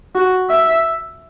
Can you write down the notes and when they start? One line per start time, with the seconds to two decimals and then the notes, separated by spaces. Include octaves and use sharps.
0.15 F#4
0.50 E5